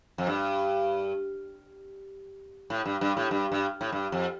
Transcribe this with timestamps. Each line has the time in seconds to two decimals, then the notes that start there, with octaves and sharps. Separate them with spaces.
0.18 F2
0.27 G2
2.70 A2
2.86 G2
3.01 G2
3.17 A2
3.31 G2
3.52 G2
3.81 A2
3.92 G2
4.12 F2